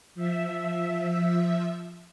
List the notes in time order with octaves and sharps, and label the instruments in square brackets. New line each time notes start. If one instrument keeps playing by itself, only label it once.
[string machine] F3 E5